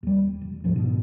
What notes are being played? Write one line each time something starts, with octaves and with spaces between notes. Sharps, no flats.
D#2 G3
E1
D2 G#2 F3
G#2 B2 D3